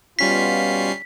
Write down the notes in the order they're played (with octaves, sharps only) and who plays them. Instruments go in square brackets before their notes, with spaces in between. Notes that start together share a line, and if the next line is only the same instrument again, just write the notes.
[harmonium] B2 F4 [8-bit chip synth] G3 C#4 C7 [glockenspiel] B6